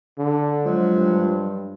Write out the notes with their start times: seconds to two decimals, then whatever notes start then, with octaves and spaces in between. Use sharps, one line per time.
0.18 D3
0.65 F3 F#3 G#3
0.97 G2